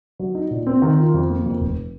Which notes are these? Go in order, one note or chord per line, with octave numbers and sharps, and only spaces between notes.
F#3
D#4
A#2
C4
D#3
F4
F2
A#3
F2
F1